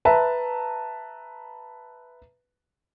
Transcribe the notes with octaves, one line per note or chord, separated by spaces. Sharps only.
B4 E5 A5 A#5